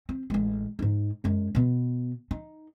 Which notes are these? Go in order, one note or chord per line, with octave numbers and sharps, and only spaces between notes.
C4
A1 G#3
G#2 D#4
F#2 G#3
B2 B3
D#4